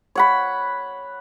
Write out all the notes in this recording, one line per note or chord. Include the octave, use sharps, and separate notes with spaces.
C#5 F#5 B5